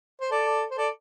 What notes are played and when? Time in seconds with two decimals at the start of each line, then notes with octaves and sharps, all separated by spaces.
0.21 C5
0.31 A4 D5
0.71 C5
0.78 A4 D5